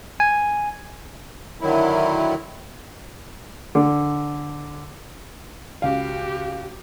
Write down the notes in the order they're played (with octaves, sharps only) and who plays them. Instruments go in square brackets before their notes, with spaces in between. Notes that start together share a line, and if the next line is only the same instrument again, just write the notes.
[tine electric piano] G#5
[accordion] D3 D#3 F#3 E4
[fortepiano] D3
[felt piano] C#2 F5 [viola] F#4 G4